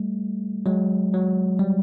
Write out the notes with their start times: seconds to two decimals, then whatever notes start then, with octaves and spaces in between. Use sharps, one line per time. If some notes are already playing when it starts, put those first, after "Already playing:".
Already playing: G3 A3
0.66 F#3 G#3
1.14 F#3
1.59 G3